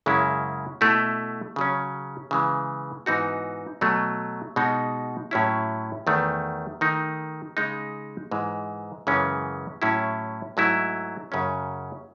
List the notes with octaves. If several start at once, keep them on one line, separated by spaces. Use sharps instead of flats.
F#2 C#3 G#3 C#4 E4
B2 A3 E4
C#3 F#3 C#4
C#3 E3 G#3
G#2 E3 B3 D#4 F#4
B2 F#3 A3
B2 G#3 D#4 F#4
A2 F#3 C#4 E4
E2 D#3 A3
D#3 A3 D#4
C#3 G#3 D#4
G#2 E3 G#3
F#2 C#3 E3 G#3 C#4
A2 F#3 C#4 E4
G#2 F#3 A3 E4
F#2 C#3 F#3 C#4